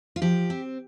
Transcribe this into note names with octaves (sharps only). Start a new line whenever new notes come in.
F4
F3 G4
C4